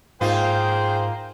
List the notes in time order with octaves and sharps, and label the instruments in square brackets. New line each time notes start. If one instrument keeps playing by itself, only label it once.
[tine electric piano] G#2 [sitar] A#3 D#4 F4 [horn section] G#4 G5 [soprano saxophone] C5